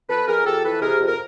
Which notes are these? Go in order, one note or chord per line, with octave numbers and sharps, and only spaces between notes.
F2 A4 B4
F2 G#4 A#4
F2 G4 A4
E3 A4 B4
C3 G#4 A#4
F2
A#4